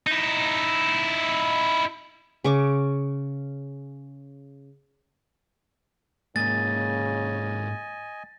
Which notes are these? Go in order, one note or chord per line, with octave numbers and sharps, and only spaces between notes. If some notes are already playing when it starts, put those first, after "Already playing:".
D#4 E4
C#3 C#6 D6
G#2 C#3 A#3 D#5 G#5 A6